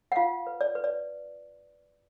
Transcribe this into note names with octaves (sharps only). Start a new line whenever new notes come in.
F#5
F4 F5
B4
D5
B4
D5